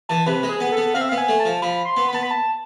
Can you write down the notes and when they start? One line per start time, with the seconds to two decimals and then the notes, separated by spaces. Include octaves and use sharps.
0.09 E3 A5
0.27 C3 B4
0.43 G#3
0.49 G#4
0.60 B3
0.72 B3 A4
0.94 C4 F5
1.01 E5
1.09 F5
1.12 B3
1.18 G#5
1.29 A3
1.40 A5
1.45 F3
1.62 F3 B5
1.85 C6
1.97 B3
2.08 B5
2.13 B3 A5
2.23 B5
2.31 A5